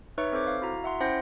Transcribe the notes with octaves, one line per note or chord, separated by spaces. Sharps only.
D#4 B4 C#5 E5 C#6
C4 A4 C5 D6
F5
E4 F#4 A#5
E5 F#5 C6
C#4 E4 C5 F#5 G5 A#6